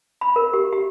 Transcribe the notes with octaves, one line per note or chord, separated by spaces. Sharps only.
B5
A#4
G4
G4